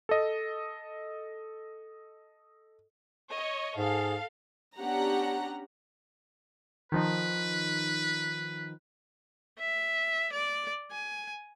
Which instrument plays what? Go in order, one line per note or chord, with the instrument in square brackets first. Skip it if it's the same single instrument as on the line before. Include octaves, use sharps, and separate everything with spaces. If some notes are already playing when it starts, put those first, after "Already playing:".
[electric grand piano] A4 D#5
[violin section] C#5 D#5
[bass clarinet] G#2 [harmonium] G#4 [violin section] A4 F5
[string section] B3 C#4 D4 G4 F#5 A#5
[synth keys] D#3 F3 D#4 [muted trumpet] B4
[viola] E5
D5
G#5